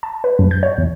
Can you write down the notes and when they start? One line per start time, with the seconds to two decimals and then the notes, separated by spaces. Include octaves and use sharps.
0.03 A5
0.24 B4
0.39 F#2
0.51 G6
0.63 C#5
0.78 E2